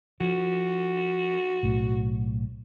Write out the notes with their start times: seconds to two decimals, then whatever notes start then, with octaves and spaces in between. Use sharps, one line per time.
0.21 F3 F#4
1.63 B1 A2